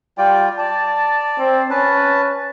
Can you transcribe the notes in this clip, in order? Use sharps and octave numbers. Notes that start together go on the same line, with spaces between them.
G3 F4 D5 G5
D5 A5
C4
C#4 B4 A5